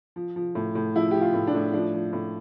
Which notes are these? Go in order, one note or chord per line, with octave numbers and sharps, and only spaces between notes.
F3
F3
A2
A2
F3 E4
F3 G4
F4
A2
D4
A2
F3 D4
F3
A2